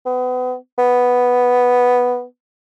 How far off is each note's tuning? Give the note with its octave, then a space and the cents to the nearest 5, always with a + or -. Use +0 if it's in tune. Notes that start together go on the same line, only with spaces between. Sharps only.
B3 +35
B3 +0